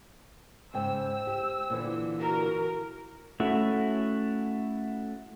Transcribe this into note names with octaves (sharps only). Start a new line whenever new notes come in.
G#2 C#3 C5 G5 E6
G4
A#2 D3 E3
F#4 A#4
A3 C#4 E4 F#4